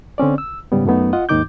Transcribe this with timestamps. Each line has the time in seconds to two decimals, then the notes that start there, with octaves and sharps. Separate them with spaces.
0.18 D3 C4 C#4 D5
0.38 E6
0.72 G#2 C#3 G3 B3
0.85 F#2 F#3 A3 B3 D#4
1.13 F4 D#5 F#5
1.29 D#2 G#2 D#3 D#4 D6 G6